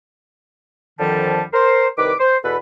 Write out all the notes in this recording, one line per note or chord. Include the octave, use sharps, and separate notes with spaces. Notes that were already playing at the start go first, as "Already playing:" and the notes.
F2 D3 D#3 F3 G3 A5
A#4 C5
C2 D#3 B4 D6
C5
E2 B2 A4 B4